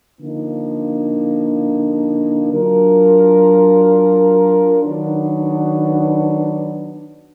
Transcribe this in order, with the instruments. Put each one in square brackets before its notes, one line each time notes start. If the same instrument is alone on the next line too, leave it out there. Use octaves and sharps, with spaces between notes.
[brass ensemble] D3 F3 A#3 D#4
F#3 D4 F4 A#4
D#3 F#3 B3 D4